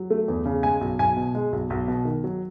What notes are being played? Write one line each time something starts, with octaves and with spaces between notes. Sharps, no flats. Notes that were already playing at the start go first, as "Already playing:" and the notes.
Already playing: F#3
A3
E2
C#3
G#3 G#5
B1
B1 G#5
B2
G#3
B1
B1
B2
D#3
F#3